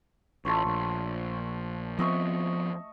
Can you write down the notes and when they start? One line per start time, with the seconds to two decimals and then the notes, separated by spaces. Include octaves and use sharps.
0.45 A1 A3 F4 C#5
0.65 A#1
1.99 F3 B3 C4 D#5 E5 C#6